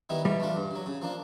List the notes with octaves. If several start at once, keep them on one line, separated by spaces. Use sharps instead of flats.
D#3 G3 B3 E4
E3 G3
A3 D4 F4
G2
D3 F#3
C#3
F3 A#3 D4